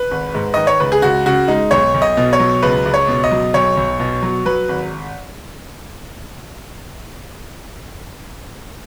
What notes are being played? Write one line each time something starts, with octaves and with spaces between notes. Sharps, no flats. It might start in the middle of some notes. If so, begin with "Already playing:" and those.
Already playing: B4
G#1
G#2
D#3 D#5
C#5
C#2 B4
G#4
C#2 F#4
C#3 F#4
G#3 D#4
B1 C#5
B1
D#5
B2
C#5
F#3
C#2 B4
C#2
C#5
B2
D#5
F#3
B1 C#5
B1
B2
F#3
F#3 B4
G#1